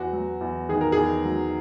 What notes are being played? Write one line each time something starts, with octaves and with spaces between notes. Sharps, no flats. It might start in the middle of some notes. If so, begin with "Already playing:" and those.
Already playing: E2 F#4
F#3
E2
D#3 G#4
A#4
E2 G#4
F#3